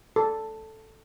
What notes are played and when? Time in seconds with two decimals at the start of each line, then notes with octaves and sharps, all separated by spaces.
0.16 A4